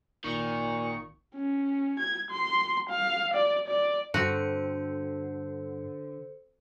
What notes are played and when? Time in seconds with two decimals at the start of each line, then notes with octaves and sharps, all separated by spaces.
0.24 G#1 A#2 D#3 C#6
1.36 C#4
2.00 G#6
2.31 C6
2.90 F5
3.34 D5
3.68 D5
4.14 G2 D3 C4 F#4 A4 C5 C#7